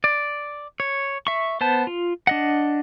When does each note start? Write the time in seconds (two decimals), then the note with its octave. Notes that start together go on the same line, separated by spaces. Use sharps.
0.04 D5
0.80 C#5
1.27 E5 C#6
1.61 B3 C5 A5
1.87 F4
2.27 D4 D#5 F#5